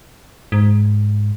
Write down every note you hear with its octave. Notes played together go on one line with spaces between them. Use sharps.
G#2